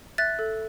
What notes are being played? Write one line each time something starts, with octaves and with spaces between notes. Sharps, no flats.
E5 F#6 A6
A4